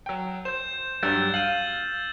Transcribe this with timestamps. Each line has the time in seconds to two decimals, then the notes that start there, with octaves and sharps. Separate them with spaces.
0.06 F#3 G5
0.45 C5 G6 E7
1.03 G2 F#3 G3 E6 G6 A6
1.34 F5 D#7 F#7